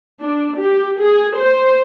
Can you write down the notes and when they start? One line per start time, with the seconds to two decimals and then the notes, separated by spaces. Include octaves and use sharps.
0.23 D4
0.61 G4
1.00 G#4
1.39 C5